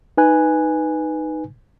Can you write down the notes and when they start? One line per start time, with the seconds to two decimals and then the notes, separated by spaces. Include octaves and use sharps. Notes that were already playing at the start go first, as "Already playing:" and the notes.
0.17 D#4 B4 G#5 F#6